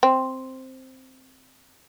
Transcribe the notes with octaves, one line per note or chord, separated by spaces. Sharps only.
C4